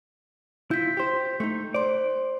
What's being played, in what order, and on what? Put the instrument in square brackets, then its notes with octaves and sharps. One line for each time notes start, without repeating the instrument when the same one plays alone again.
[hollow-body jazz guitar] E4 F4 [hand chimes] G6 B6
[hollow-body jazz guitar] G4 C5
A3 D#4
[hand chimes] C5 C6 [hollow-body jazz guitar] D5